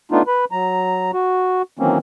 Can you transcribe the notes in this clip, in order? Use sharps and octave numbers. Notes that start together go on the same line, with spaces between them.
A3 B3 D4 D#4 F4
B4 B5
F#3 A#5
F#4
D#3 E3 F#3 A#3 C4 C#4